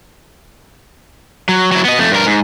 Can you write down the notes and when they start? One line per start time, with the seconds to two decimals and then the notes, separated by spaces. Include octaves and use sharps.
1.49 F#3
1.72 F#3 E4
1.85 B3 D#5
1.98 F2 A3
2.11 G2 A#4
2.26 G#2